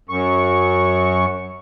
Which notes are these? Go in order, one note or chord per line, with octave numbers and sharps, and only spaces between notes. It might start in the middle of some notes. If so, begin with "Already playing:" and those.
F#2 C#6